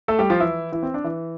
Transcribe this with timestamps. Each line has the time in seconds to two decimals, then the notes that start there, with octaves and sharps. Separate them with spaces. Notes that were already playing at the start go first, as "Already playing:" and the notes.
0.08 A3 A4
0.19 G3 G4
0.30 F3 F4
0.40 E3 E4
0.72 E3 E4
0.83 C4
0.94 D4
1.04 E3 E4